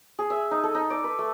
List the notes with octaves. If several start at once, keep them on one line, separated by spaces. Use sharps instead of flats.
G#4
E5
D#4
A4
D#4
D5
B4
A3